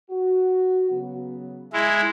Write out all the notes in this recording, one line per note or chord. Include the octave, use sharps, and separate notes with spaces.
F#4
C#3 F#3 B3
G#3 E4